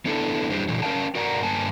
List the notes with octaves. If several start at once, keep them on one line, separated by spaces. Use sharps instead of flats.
B3 D4 E4 A4
F2 G3 D4 E4 G4 C5
A#2 D3 E3 F#3
C#4 A#4 D#5 F5 G5 A5
F#4 A#4 D5 F#5 G#5 A#5
G2 A#3 G#5 A5